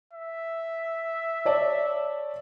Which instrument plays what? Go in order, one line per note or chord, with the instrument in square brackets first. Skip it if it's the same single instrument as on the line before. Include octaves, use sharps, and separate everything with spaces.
[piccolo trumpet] E5
[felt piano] C#5 D5 A5